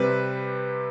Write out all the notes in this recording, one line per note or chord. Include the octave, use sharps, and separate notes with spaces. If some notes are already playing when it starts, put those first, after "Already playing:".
Already playing: C3 G3 C4 B4